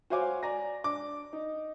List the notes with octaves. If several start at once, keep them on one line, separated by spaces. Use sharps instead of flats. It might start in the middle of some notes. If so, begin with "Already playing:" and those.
F#4 C5 C#5 F5 G#5 D6
D5 G#5 A#5 A#6
D4 D6
D#4